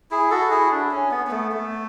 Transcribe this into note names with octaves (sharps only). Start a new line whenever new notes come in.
E4 G#4
F#4 A4
E4 G#4
D4
C#4
B3
B3
A3
A3